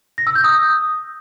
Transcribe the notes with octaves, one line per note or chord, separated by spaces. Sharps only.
A#6
E6
G6
D#6